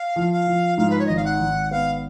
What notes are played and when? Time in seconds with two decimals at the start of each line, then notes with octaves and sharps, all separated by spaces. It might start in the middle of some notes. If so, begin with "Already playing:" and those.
Already playing: F5
0.16 F3
0.32 F5
0.47 F3
0.78 G#2 F5
0.90 B4
0.99 C#5
1.07 G#1 D#5
1.17 F5
1.24 F#5
1.40 G#1
1.71 B3 F5